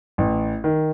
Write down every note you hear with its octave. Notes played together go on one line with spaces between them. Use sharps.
A1
D#3